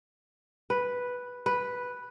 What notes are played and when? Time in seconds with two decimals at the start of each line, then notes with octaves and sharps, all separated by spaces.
0.70 B4
1.46 B4